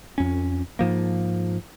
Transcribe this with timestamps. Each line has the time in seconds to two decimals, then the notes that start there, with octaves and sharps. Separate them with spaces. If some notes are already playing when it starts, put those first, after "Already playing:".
0.18 F2 C#4
0.79 G#2 F3 A#3